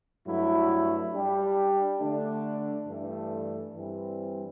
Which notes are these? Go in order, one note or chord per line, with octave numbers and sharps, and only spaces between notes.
G2 F#3 A3 E4
G3 D4 G4
D3 A3 D4
G2 E3 A3 D4 A4
G2 E3 G3 C4